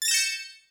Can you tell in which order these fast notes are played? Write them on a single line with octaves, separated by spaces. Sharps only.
A6 A#6 E7 G6 C#7